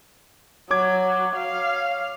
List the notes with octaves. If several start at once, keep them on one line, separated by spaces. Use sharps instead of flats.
F#3 C#5 D6 G#6
F5